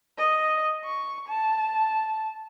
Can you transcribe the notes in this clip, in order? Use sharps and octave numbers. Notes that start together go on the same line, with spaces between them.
D#5
C#6
A5